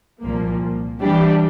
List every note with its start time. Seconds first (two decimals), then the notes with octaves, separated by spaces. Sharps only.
0.21 C2 A#2 F3 A#3
1.01 E3 G3 D4 G4